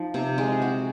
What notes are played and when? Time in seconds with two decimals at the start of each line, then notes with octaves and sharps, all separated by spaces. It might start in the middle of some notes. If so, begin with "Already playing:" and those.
Already playing: F3 D#4
0.14 C3
0.38 G#3
0.62 F#4